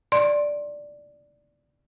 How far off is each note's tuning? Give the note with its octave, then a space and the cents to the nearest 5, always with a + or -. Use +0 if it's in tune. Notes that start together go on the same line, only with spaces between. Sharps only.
D5 +0 C6 +25